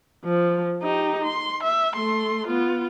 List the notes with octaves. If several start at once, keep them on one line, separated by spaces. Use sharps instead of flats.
F3
D#4 G4
C6
E5
A3 C6
B3 F4